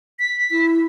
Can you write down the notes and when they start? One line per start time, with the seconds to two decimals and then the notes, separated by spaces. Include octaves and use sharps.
0.19 B6
0.51 E4